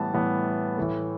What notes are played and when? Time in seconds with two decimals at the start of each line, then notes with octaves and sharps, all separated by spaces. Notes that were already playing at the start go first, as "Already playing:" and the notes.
Already playing: A2 E3 G3 B3 A5
0.13 A2 E3 G3 B3
0.77 A2 E3 A3